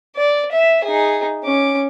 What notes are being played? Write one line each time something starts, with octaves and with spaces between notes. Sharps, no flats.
D5
E5
D#4 G#4
C#4 D6